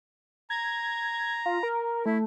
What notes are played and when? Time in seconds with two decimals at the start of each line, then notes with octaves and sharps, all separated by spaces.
0.50 A#5 G#6
1.46 F4
1.63 A#4
2.06 A3 E4